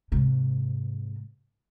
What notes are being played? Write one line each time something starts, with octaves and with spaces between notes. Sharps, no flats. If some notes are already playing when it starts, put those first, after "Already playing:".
G#2 C3